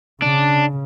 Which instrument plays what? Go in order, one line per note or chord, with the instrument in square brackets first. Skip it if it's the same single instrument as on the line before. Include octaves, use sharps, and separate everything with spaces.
[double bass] C#3 [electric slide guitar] D4